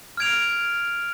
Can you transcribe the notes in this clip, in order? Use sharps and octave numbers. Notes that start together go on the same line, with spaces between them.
F6 G#6 D7 F7